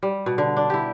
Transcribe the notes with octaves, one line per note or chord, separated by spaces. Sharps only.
G3
B2
D3
D4
E4 G4